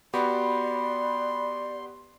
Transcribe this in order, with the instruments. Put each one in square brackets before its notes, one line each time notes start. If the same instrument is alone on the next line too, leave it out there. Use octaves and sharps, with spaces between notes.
[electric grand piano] B3 F#4 G4 [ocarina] D5 [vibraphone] B5 [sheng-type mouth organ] C6